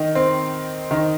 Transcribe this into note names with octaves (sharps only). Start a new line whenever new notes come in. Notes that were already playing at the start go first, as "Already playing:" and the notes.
Already playing: D#3 D#4
C4
D#3 D#4